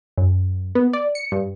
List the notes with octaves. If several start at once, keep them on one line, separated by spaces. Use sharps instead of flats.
F#2
B3
D5
C#7
G2